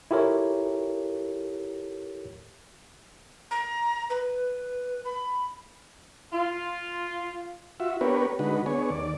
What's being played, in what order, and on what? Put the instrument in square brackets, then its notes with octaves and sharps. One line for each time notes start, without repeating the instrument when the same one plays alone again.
[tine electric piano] E4 F4 G4 A4 A#4 C#5
[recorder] A#5
B4
B5
[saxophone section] F4
[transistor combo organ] F4 F#4 E5
B3 D4 G4 A#4 B4 C#5
D3 G#3 D#4 F#4 B4
B3 D4 G#4 C#5
D#2 D5